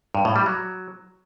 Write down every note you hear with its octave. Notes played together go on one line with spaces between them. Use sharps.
G2
A2
G3
F#3